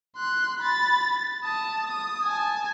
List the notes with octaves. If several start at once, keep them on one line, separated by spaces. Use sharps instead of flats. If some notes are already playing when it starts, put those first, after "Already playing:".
C6 F#6
B5 A6
A5 D#6
D#6
G#5 A5